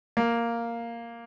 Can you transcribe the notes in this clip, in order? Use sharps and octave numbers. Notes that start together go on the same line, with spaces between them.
A#3